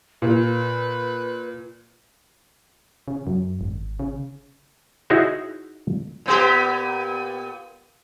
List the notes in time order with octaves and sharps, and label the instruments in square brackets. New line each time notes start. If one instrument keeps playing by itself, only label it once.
[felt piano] A#2 [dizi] B4
[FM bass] C#3
F#2
G#1
C#3
[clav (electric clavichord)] D#4 E4 F#4 G#4 C#5 E5
[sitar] A#2 B3 G4